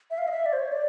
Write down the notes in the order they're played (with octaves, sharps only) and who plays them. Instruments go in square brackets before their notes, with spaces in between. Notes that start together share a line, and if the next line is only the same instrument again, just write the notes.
[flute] E5
F5
D#5
E5
D5
C5
C#5
D5